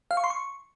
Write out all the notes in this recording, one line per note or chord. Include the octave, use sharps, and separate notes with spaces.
F5
C#6
C6
C#6